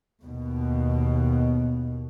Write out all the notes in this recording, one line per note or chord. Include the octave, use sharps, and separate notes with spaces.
D#2 B2